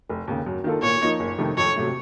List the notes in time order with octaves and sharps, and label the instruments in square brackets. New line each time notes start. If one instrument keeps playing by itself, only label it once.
[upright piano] F1
D#2 C#3
F#2
D#3 A#3 F4 A4
[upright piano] A#2 [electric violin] C#5
[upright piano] F3 A#3 D#4
F#1
F2 C3 D#3 A3
[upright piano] F2 [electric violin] C#5
[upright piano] C3 F#3 A3